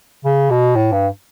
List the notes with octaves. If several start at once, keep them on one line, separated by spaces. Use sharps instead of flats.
C#3
B2
A2
G2